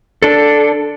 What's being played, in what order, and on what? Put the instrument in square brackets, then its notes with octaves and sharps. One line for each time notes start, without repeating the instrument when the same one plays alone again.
[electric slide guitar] D4 A4